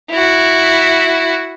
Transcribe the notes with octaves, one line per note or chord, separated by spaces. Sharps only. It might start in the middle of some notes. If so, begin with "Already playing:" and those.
E4 F#4